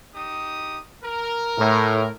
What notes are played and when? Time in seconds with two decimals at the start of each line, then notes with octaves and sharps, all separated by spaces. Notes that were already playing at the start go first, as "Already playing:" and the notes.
0.15 D#4 G4 D#6
1.03 A#4
1.58 A2